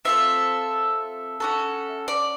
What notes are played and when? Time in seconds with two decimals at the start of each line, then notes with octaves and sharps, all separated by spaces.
0.05 C4 F4 A4 E5
1.40 C#4 F#4 A4
2.08 D5